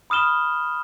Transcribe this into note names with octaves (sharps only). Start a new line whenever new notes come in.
B5 D#6 F6 E7 G7